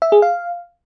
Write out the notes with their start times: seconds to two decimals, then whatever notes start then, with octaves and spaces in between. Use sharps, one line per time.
0.02 E5
0.12 G#4
0.22 F5